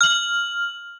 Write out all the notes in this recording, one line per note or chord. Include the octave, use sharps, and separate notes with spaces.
F6 F#7